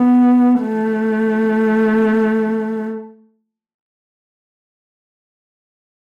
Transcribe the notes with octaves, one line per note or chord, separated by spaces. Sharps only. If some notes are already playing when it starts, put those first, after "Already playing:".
Already playing: B3
A3